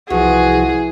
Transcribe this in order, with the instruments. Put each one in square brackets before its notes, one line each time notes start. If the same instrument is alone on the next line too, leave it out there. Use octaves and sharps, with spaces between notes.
[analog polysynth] C2 F3 [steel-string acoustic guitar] E3 [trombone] F#4 [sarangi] G#4